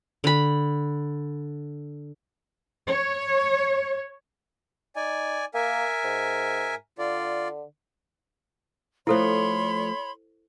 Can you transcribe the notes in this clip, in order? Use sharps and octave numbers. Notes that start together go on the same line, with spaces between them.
D3 B5
C#5
D#4 D5 G#5
A#3 A#4 E5 G#5
G#2
D3 F4 D5
F3 A3 E4 A4 C5 C#5 B5 C6